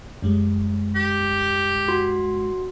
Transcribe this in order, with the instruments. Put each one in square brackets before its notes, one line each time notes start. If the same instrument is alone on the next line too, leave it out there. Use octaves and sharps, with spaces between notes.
[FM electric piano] F#2 G3 G#3
[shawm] G4
[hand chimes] F#4 C6